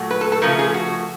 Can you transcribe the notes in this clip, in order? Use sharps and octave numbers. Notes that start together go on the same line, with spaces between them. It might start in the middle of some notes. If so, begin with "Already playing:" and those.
Already playing: A#2 F#3 A3
B4
A4
A4
C#3 F3 A3 A#4
G#4
F#4